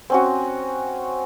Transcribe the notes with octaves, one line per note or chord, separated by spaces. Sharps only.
C4 C#4 F#4